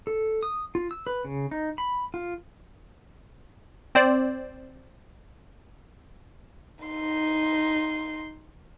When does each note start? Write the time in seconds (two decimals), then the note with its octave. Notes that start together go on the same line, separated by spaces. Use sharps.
0.07 A4
0.43 D#6
0.75 F4
0.91 E6
1.07 B4
1.25 C#3
1.51 D#4
1.78 B5
2.14 F4
3.95 C4 C5 D5
6.85 D#4 C6